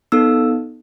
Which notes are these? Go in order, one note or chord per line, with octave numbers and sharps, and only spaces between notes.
B3 D#4 A4 E6